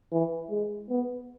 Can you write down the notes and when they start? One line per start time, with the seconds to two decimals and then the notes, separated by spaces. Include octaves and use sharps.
0.12 E3
0.51 G#3
0.89 B3